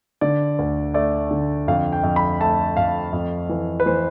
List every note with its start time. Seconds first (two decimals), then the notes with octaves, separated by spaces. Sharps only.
0.21 D3 D5
0.59 D2
0.94 A3 D5
1.31 D3
1.68 F2 F5
1.92 G5
2.03 F2
2.16 B5
2.40 A3 A5
2.77 F2 F5
3.13 F2
3.49 E3
3.80 B4
3.86 E3 C5